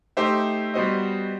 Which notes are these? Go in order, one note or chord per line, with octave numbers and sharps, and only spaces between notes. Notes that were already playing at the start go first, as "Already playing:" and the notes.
A3 D#4 G4 C5 E5
G3 B3 F#4 C5 D#5